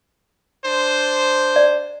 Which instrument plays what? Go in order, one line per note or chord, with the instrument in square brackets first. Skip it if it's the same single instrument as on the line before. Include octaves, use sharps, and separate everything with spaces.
[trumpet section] D4 C5
[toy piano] D5